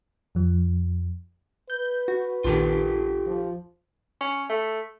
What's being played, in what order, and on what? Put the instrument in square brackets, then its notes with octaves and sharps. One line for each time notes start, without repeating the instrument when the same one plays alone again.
[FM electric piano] F2 F3
[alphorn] B4 [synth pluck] G6
[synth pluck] F#4
[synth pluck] A#1 D#2 D#3 [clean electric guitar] F4 G4 A4
[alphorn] F3
[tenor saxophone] C#4
A3